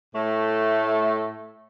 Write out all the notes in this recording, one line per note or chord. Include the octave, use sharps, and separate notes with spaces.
A2 A3